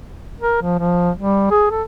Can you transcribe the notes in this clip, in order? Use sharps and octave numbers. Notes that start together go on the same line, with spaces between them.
A#4
F3
F3
G3
G#4
A4